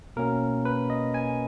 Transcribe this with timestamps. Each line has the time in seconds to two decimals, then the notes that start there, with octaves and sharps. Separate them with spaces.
0.16 B2 A#3 C#4 A#4
0.65 B4
0.90 D#5
1.14 G#5